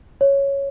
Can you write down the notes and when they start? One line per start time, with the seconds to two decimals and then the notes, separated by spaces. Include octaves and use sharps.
0.21 C#5